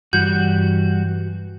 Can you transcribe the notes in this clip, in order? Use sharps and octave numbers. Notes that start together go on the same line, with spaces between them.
G2 E3 G3 F#4 G6